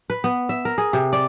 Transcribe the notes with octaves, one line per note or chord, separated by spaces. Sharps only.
B4
B3
E5
A#4
G#4
C3
D5